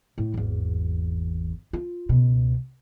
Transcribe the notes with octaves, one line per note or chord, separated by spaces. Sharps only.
A2
G#1 E2
F4
C#2 B2